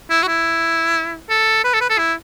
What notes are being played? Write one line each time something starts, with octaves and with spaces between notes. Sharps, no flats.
E4
F#4
E4
A4
B4
A4
B4
A4
E4